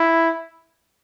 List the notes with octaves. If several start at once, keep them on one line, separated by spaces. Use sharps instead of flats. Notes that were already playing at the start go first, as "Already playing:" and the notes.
Already playing: E4